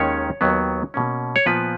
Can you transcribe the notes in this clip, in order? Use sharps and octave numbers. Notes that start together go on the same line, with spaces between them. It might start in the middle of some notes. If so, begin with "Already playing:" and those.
Already playing: D#2 D#3 G#3 C#4 C#5
D#2 D#3 F#3 B3
B2 A#3 C#4
C#5
A#2 F3 B3 B4